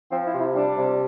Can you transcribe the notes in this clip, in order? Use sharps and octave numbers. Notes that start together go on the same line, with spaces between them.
F3 C4
E4
C3
E4
G3 D4
C3